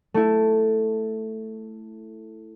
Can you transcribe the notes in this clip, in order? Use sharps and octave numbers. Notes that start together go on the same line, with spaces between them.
A3 E4